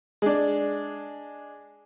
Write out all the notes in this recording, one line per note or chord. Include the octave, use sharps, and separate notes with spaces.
G#3 D4